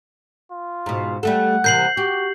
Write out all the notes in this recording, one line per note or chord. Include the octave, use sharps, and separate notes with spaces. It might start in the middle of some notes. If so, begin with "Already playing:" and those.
F4
G#2 B2
G3 A3 A4 F#5
C3 E3 A#3 G6 C7 F#7
F#4 G4